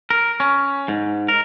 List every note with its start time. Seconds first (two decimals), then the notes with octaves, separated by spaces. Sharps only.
0.10 A#4
0.40 C#4
0.88 G#2
1.28 A#4